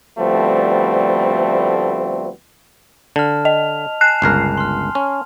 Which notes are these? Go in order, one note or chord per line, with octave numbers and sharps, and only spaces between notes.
D2 F3 G3 A3 B3 C4
D3 A5 F6
D#5 F7
G#5 A5 F#6 C7
G1 C#2 A#4
C6 F6
C#4